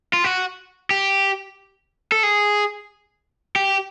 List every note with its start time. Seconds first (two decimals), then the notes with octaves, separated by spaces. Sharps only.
0.13 F4
0.24 F#4
0.91 G4
2.12 A4
2.23 G#4
3.56 G4